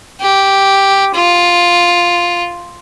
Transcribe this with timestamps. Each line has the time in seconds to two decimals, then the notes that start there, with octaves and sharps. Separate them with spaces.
0.21 G4
1.15 F4